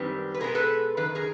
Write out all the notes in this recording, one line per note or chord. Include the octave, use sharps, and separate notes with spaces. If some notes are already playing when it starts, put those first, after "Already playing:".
Already playing: F#2 D#3 G3 C4 B4
B4
B2 G#3 B3 G#4 A#4
A4 B4
F#2 D#3 B4
G#4 A#4